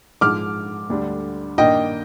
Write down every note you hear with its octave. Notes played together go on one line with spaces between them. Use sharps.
G#2 F3 G#3 D6 F6
D2 D3 G3 D4
G2 D#3 A#3 D4 D#5 G5